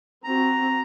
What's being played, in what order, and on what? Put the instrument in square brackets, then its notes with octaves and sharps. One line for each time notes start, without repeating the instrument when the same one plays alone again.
[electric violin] C4 F#4 [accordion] A#5